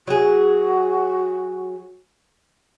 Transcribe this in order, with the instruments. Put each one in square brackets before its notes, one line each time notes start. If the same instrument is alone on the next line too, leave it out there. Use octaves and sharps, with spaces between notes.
[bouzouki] F#3 G#4 [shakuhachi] F#4